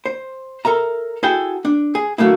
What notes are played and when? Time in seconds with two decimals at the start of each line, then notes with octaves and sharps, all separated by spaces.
0.06 C5
0.65 A4 A#4 E5 A#5
1.23 E4 F#4 G#4 A4 F#5 G5
1.65 D4
1.95 G#4
2.18 D3 F#3 A3 A#3 E4